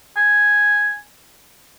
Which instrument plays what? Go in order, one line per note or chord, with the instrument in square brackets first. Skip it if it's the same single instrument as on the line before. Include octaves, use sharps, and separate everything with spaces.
[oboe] G#5